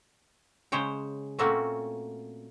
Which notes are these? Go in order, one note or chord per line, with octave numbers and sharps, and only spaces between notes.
C#3 G#3 C5 C#5 G5
A#2 A3 A#3 C4 C#4 F#4